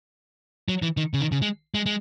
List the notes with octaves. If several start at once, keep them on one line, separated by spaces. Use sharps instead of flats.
F#3
E3
D#3
C#3
D#3
C#3
G#3
G#3
G#3